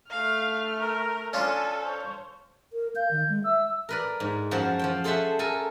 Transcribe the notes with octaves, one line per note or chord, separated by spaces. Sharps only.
A3 F5 F6
A#4
C#4 D4 F4 A4 G#5
C5 C#5
A#4
F5 G6
D#3
G#3
E5 E6
A#4 B4 D5
G#2
F#2 F3 F#4 C5 A5
F3 C5 G5
G#4 A4 C5 C#5 E5 F#5
A4 A#4 G#5